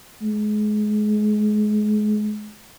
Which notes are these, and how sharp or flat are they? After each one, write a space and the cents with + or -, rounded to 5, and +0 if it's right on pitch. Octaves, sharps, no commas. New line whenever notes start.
G#3 +30